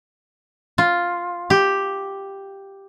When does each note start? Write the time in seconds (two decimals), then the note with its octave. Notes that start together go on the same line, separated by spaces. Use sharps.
0.78 F4
1.50 G4